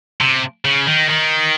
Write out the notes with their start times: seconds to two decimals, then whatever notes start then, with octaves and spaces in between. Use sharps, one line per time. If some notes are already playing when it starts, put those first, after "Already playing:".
0.21 C3
0.65 C#3
0.87 D#3
1.10 D#3